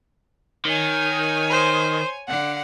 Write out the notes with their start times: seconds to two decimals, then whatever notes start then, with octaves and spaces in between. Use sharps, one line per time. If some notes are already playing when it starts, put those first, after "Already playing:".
0.65 D#3 C#5 G#5
1.51 C5
2.28 D3 F5 F#5